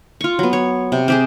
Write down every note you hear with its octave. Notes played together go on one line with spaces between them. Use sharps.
F4 C#6
F#3 B3
C#5
C3
C4 G4 G#4